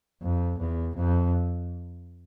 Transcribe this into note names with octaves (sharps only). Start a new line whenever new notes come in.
F2
E2
F2